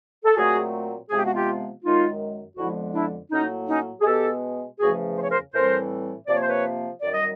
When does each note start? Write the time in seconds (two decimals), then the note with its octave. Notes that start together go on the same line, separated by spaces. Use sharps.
0.24 A4
0.35 A#2 F#3 A3 C4 F#4 G#4
1.10 C3 F3 G#3 B3 G#4
1.18 G4
1.28 F#4
1.35 F4 G4
1.83 F#2 D#3 G#3 D#4 F4
2.57 F2 D3 F3 G#3 B3 E4 F#4
2.94 D4 E4
3.31 A2 F#3 A#3 C#4 D#4
3.68 C#4 D#4
4.01 G#4
4.05 B2 G#3 B3 G4 A4
4.79 E2 C#3 F3 A3 F#4 G#4
5.17 C5
5.24 C#5
5.31 A#4 C5
5.54 A2 E3 G3 C4 A#4 C5
6.27 C3 F3 A#3 D5
6.35 C#5
6.42 C5
6.49 B4 C#5
7.02 F#2 D#3 G3 D5
7.14 D#5